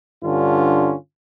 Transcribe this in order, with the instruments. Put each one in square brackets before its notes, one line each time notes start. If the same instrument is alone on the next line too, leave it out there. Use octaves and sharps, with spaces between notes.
[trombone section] G2 D3 C#4 F4